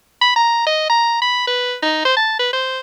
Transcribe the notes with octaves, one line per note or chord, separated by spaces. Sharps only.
B5
A#5
D#5
A#5
B5
B4
D#4
C5
A5
B4
C5